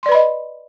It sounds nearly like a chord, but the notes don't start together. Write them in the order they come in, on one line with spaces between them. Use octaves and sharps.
C6 D5 B4 B5 D#5